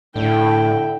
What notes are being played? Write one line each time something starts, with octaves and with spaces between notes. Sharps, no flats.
A2 D3 E4 G5